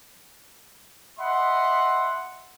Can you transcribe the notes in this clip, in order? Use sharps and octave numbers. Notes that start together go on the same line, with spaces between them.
D#5 E5 F#5 B5 C6